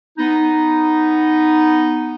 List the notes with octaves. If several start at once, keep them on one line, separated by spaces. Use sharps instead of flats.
B3 D#4